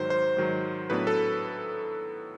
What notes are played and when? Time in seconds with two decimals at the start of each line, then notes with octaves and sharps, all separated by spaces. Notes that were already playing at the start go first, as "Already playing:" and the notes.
Already playing: G#2 D#3 F#3 C5
0.10 C5
0.37 G#2 D#3 F#3
0.90 A2 F#3 B3 D4 B4
1.07 A4